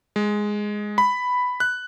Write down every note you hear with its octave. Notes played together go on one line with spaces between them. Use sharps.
G#3
B5
F#6